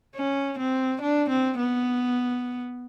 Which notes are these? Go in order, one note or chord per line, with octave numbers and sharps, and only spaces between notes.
C#4
C4
D4
C4
B3